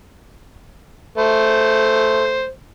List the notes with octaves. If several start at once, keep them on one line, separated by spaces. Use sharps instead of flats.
A3 C5